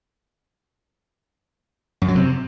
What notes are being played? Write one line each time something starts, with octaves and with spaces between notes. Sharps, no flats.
F#2
F#3
C3